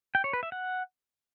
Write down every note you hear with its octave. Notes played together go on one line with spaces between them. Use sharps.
G5
C#5
B4
E5
F#5